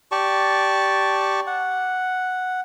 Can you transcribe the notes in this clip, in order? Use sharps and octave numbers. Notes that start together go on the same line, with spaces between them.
G4 D5 A5 C#6
F#5